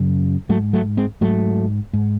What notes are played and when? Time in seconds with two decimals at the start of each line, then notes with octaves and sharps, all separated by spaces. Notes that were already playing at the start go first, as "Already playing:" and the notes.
Already playing: F#2 C#3
0.49 G#2 F#3 A3
0.73 F#3 A3
0.97 G#3 C4
1.21 G#2 F#3 A3
1.93 G#2